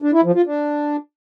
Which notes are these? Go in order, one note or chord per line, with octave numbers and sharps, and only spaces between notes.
D4
E4
F3
F4
D4